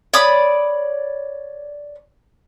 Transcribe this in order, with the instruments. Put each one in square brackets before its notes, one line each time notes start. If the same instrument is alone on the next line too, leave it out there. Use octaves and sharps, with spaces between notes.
[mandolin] C#5 D5 B5 D#6